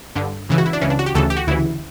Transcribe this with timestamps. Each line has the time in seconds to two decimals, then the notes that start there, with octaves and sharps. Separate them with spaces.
0.15 G2 D3
0.49 C#2 C#3 E3
0.58 F#4
0.66 E4
0.73 D4
0.81 C#2 C#3 E3 C#4
0.90 D4
0.99 F#4
1.06 G4
1.15 D2 C#3 E3 A4
1.30 G4
1.36 F#4
1.48 D2 C#3 E3 E4